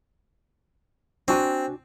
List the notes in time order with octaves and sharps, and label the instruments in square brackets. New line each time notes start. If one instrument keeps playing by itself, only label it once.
[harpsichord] C4 [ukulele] D4 F#4 G#5